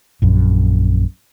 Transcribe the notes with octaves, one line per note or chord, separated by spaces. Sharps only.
A#1 F#2